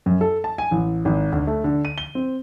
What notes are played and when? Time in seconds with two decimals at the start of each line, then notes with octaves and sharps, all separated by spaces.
0.06 F#2
0.21 A4
0.44 A5
0.58 G#5
0.71 A1
1.05 G#1
1.32 D2
1.47 A3
1.64 D3
1.85 D#7
1.98 G7
2.15 C4